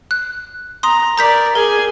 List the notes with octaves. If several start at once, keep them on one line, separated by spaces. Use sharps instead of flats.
F#6
A#5 C6 D#6
A#4 D5 A#5 G6 B6
G#4 A#4 G#5